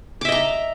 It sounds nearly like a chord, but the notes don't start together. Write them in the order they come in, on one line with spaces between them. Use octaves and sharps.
D6 E5 D#5 A#5